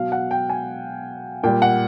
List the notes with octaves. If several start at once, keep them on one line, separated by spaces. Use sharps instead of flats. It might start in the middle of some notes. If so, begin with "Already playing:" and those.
Already playing: B2 F#3 F5
F#5
G5
G#5
A#2 G3 G5
F#5